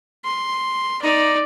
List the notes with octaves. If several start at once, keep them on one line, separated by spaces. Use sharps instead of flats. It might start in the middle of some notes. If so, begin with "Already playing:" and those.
C6
D#4 D5